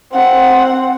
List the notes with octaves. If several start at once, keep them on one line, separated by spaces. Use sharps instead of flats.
C4 F#5